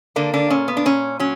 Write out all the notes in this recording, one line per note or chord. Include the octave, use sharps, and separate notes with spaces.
D3 A#3 D4
D3 D4
A#2 C#4
B3
D4
A#2 C#4
F#3 C#4